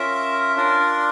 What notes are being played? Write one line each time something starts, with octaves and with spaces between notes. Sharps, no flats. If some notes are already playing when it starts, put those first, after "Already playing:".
Already playing: C#4 F4 A#4 E5
D4 F4 A#4 D5